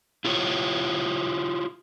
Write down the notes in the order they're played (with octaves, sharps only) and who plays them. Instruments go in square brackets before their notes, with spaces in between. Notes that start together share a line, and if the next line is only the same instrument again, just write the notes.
[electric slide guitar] E4 F4 G4 C#5